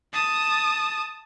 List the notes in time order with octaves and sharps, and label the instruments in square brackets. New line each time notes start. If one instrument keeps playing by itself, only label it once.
[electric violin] A5 D#6